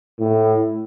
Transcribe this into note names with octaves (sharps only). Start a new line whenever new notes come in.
A2